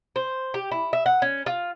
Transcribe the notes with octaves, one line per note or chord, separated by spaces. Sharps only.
C5
G4
E4
E5
F#5
C#4
F4